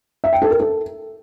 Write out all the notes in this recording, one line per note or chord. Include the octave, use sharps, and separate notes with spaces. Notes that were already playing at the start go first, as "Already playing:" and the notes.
E5
G5
A4
A#4
A4